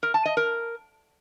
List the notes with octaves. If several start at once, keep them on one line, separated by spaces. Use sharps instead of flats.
A#4
A5
D#5
A#4